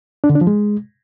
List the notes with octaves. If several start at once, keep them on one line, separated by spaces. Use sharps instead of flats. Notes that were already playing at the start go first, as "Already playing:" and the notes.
D4
D3
D4
F3
G#3